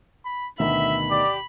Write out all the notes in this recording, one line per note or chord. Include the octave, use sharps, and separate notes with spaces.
B5
D2 B2 D#3 E5 B5
G4 D5